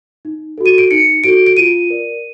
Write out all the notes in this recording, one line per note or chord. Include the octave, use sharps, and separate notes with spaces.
D#4
F#4 A4
D#7
D7
D#4 C#7
F#4 A4 D7
D7
F4 D#7
A#4 D5